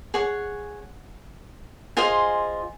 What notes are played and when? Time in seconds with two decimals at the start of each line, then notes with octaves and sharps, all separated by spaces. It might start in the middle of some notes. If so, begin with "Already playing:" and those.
0.14 G#4 C#5 F#5
1.97 F4 G#4 C5 D#5 G#5